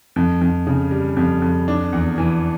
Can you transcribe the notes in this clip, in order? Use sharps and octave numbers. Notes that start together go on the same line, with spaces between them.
F2
F2
C#3
G3
F2
F2
D4
E2
E3